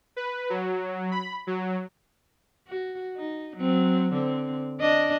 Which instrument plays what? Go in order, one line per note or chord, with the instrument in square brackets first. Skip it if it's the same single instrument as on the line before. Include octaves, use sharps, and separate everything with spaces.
[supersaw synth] B4
F#3
B5
F#3
[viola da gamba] F#4
D#4
F#3 C4
D3 C4
D4 D#5